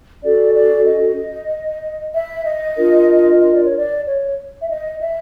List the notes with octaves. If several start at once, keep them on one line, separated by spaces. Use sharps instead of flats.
C#4 F#4 A4 D5
D5
D#5
E5
D#5
D4 F4 A#4
D#5
D5
C#5
D5
C#5
E5
D#5
E5